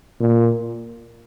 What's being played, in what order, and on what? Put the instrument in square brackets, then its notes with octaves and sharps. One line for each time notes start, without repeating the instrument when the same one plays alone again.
[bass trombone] A#2